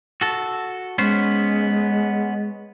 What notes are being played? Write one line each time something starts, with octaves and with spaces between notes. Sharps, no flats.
F#4 A4
G#3 B3 C#4 C5